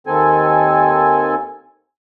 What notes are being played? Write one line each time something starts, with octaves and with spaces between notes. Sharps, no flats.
D#2 D#3 C4 A4 G#5